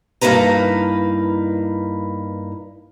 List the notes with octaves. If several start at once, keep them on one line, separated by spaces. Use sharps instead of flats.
G2 A#3 D#4 E4 B4 A#5